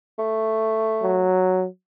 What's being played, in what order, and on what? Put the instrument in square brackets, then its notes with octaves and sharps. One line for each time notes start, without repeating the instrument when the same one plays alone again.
[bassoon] A3
[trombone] F#3